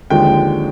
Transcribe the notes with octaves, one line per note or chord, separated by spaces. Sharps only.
D#2 D3 F3 G#3 G5